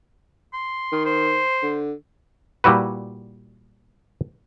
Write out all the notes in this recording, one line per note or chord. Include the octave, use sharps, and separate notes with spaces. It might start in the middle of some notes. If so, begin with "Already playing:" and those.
C6
D#3
C5
D3
A#2 G3 E4 F#4 B4